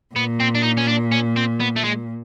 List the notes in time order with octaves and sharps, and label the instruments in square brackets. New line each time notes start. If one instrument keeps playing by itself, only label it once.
[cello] A#2 [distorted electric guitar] B3
[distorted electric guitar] C4
D4
D#4
C#4
D4
C#4
C4
B3
A3
G#3